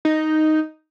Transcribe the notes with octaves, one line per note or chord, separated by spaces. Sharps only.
D#4